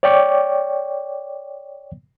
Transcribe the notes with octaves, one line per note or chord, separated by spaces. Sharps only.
C#5 D5 G5 C#6 D6